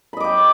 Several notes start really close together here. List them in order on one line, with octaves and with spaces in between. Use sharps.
B5 D#5 D6 G5